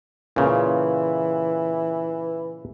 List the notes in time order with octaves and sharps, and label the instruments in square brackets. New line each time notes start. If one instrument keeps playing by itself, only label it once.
[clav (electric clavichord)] A#2 C#3 [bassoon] E3